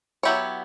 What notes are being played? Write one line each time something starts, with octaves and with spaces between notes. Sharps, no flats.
F#3 B3 E4 G4 C#5